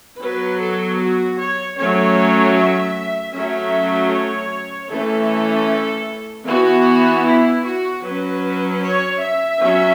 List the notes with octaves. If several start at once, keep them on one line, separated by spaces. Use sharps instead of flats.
F#3 B3 B4
A4
F#4
C#5
F#3 A3 C#4 C#5
E5
F#3 A3 C#4 E5
C#5
E3 A3 C#4 A4
E3 B3 F#4
E4
F#4
F#3 C#4 B4
C#5
E5
F#3 C#4